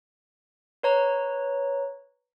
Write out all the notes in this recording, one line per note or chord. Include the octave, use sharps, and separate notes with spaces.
B4 C#5 A#5